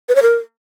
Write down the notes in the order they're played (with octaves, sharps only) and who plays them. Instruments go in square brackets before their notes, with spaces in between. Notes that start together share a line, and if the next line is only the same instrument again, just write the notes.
[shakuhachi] B4
C#5
A#4